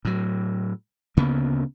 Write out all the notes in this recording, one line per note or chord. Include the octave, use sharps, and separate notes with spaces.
A2 F#3
D2 C#3 A#3 B3